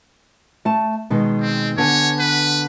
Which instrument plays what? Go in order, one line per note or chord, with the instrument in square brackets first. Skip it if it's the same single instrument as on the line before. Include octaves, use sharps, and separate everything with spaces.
[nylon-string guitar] A3 A5
B2 D#3 G#3
[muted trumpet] C4
[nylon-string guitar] D3 B3 G#5 [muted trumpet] C#5
[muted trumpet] B4